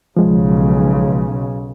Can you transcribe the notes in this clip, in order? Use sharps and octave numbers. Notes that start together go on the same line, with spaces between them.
B1 C#3 F3 G#3